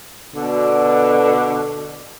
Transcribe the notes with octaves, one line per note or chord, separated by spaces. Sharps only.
B2 D3